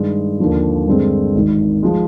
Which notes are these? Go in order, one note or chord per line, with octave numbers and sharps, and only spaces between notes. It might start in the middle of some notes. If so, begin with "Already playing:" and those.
Already playing: G2 D#3 G#3
D#2 D3 F3
G2 D3 G#3 C4
G#1 G#2 D#3
F3 G#3